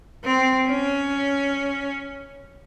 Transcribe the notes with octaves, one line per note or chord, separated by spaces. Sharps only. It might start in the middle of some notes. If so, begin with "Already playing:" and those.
C4
C#4